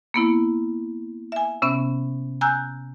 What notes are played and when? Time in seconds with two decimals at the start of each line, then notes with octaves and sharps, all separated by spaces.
0.14 A#3 B3 E4
1.32 E5 G#5
1.62 C3 B3 C#4 E5
2.41 G#5 A#5 E6 F#6 G6